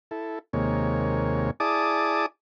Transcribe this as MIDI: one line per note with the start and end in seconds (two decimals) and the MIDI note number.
0.11 0.39 64
0.11 0.39 69
0.53 1.51 39
0.53 1.51 48
0.53 1.51 56
0.53 1.51 58
0.53 1.51 73
1.60 2.26 64
1.60 2.26 68
1.60 2.26 74
1.60 2.26 81
1.60 2.26 86
1.60 2.26 87